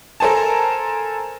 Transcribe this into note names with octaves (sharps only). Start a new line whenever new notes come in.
A4 A#4 C5 G#5 A5